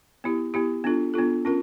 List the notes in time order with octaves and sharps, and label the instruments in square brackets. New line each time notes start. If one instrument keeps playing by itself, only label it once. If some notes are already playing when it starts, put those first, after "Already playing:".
[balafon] B3 E4 G4
B3 E4 G4
B3 D4 F4 A4
B3 D4 F4 A4
C#4 F4 A#4